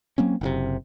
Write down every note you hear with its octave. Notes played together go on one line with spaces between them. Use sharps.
F#3 A#3 C4 C#4
F#1 A2 C3